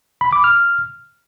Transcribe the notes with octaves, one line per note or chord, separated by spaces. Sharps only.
B5
D6
F6